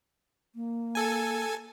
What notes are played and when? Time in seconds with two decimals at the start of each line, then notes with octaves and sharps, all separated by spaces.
0.55 A#3
0.95 A4 G#5